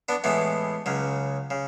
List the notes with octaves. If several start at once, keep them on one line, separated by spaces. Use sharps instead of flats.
B3 D4
A2 E3 G#3 B3
C#2 C#3 F#3
C#3